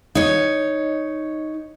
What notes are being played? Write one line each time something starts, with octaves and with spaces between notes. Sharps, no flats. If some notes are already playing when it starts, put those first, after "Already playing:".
D#4 C#5